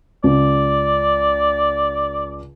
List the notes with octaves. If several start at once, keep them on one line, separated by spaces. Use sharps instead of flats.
C#2 D5